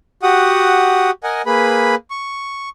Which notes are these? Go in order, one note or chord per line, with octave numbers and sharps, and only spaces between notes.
F#4 G4 F#5 D#6
A#4 D#5 F#5 G#5
A#3 G#4 B4 B5
C#6